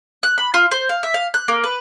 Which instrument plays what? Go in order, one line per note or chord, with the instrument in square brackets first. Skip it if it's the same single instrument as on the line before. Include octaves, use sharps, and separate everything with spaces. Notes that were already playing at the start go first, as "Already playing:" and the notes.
[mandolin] F#6
B5
F4
C5
F5
E5
F5
F#6
A#3
B4